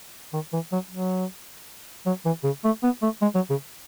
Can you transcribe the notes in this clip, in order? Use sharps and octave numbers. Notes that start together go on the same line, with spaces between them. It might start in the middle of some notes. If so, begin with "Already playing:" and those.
D#3
E3
F#3
F#3
F#3
E3
C#3
A3
B3
A3
G#3
F#3
C#3